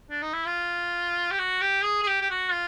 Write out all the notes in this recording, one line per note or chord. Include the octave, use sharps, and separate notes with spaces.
D4
D#4
E4
F4
G4
F#4
G4
G#4
G#4
G4
G4
F#4
F4